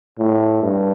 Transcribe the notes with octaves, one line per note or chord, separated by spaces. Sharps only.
A2
G2